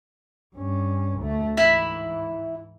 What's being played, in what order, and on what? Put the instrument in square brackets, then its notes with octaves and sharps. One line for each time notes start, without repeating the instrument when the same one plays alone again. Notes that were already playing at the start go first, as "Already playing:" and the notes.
[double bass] G2 C#4
D2 A3
[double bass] G#2 E3 [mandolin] E4 B5